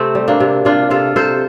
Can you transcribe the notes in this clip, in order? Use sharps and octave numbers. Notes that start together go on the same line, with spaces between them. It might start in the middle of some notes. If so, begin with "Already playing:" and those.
Already playing: C3 A3 C4
G3
A#3 D4
C3
C3 D4 F4
C3 F4 A4
C3 A4 C5